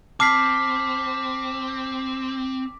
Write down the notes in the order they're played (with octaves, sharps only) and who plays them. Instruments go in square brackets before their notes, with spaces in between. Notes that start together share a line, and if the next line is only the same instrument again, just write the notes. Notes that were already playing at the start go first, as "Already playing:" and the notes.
[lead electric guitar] C4 [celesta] A5 F6 C7 [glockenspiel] D6 B6